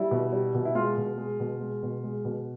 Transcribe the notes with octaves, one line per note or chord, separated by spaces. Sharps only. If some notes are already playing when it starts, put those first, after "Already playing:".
Already playing: G3 E4
B2
G3
B2
E4
G#3 F4
B2
G#3
B2
G#3
B2
G#3
B2